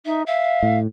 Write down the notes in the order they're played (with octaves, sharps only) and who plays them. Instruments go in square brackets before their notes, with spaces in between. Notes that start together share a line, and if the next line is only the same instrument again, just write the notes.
[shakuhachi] D#4 [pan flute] E5
[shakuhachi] E5 [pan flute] F5
[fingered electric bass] A2